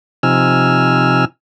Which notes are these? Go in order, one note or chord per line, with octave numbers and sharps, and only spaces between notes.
C3 F3 D#4 G#5 E6 F6